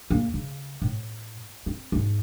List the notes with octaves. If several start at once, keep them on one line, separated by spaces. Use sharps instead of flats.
E2 A#3
C#3
A2
C4
E2 G#2